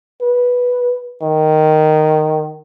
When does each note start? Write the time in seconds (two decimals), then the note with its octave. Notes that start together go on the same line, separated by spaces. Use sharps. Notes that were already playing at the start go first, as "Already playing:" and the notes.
0.22 B4
1.22 D#3